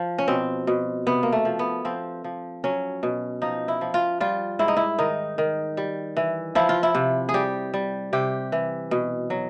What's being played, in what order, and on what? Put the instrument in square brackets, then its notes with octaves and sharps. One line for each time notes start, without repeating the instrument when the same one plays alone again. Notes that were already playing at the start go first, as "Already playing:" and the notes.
Already playing: [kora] F3
C#4
B2 C4
B2
C3 B3
A#3
A3
F3
B3
F3 C4
F3
F#3 C#4
B2
F3 D#4
E4
F3
F4
G3 F4
G#2 E4
D#4
E4
D#3 D#4
D#3
G3
E3
F3 E4
F4
E4
C3
G#4
G3 G4
G3
C3 G4
E3
B2
F#3